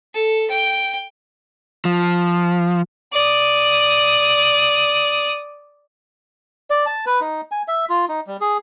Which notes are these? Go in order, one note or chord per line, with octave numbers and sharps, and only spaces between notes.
A4
G5
F3
D5 D#6
D5
A5
B4
D#4
G#5
E5
F4
D#4
G3
G#4